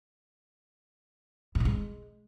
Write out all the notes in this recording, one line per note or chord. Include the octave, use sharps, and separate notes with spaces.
F#2
G#2
G#3